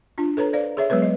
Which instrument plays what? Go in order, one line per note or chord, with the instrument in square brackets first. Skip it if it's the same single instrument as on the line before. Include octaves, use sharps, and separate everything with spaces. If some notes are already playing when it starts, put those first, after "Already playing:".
[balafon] D4 F4
A4 B4 C#5 A#5
C5 D5 F5
G#4 C#5 E5
F#3 G#3 B3 B4 C#5 E5
D#5